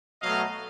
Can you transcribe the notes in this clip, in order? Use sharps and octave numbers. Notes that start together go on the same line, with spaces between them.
B2 F#3 A3 D#5 F5